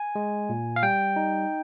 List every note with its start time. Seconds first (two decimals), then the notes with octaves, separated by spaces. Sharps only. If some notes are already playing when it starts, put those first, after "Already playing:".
Already playing: G#5
0.15 G#3
0.49 A#2
0.76 F5
0.83 G3 G5
1.16 D#4